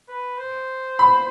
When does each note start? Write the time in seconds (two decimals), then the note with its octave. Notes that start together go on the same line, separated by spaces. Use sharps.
0.08 B4
0.38 C5
0.99 B5